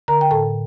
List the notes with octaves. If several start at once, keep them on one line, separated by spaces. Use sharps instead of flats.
D3 A#4 A#5
G5
A2 A4 A5